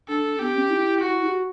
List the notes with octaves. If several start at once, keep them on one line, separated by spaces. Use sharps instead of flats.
D4 A4
B3 G4
C#4
E4
F#4
G4
F#4